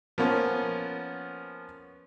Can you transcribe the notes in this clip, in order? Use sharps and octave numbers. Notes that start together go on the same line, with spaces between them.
F3 A#3 B3 C#4